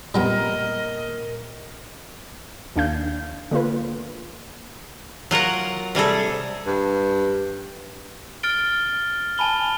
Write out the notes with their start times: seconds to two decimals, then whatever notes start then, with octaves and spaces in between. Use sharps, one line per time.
0.14 A#2 G3 B3 C4 A#4 D#5
2.76 D#2 D4 F5 G6
3.51 D3 A#3 F4 B4
5.31 F#3 F4 A#4 F#5
5.95 C3 G3 G#4 A4
6.67 G2
8.43 F6 A6 D7 G7
9.38 G#5 A5 B5 G7